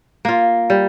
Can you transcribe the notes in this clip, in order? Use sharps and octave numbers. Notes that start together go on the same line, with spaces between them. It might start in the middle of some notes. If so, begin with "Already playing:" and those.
A#3 F4
G3